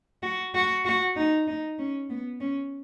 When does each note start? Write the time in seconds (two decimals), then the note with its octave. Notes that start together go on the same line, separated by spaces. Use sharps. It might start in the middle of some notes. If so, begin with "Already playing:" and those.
0.23 F#4
0.54 F#4
0.85 F#4
1.16 D#4
1.47 D#4
1.79 C#4
2.10 B3
2.40 C#4